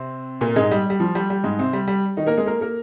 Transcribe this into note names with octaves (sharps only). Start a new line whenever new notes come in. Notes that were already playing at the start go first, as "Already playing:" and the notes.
Already playing: C3 C4
A#2 A#3
G#2 G#3
G3
G3
F3
G3
G3
G#2 G#3
C3 C4
G3
G3
D#3 D#4
A#3 A#4
G#3 G#4
A#3 A#4
A#3 A#4